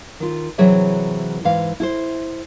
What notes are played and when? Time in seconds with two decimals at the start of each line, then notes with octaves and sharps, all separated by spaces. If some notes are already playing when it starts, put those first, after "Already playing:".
0.20 D#3 F4
0.58 C3 E3 F#3 G#4 E5 G5
1.44 G#2 E3 F5
1.80 E4 G#4 C5